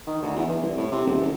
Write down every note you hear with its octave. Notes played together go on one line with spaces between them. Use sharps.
D#3
D2
E2
E2
C2
A2
C3
D#1
F#1